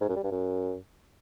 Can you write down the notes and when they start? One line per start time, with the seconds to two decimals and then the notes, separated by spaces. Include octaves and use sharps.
0.01 G#2
0.09 F#2
0.16 G3
0.24 G2
0.31 F#2